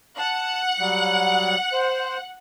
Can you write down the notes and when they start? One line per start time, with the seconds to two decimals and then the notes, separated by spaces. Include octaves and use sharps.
0.18 F#5 A5
0.80 F#3 G3
1.72 C5